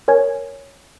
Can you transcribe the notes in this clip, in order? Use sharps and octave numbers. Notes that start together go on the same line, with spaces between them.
A#4 C#5 G#5 G#6